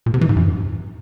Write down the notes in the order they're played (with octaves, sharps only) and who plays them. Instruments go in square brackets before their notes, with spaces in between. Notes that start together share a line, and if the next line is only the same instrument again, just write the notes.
[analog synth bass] A#2
C3
E3
G#2
F#2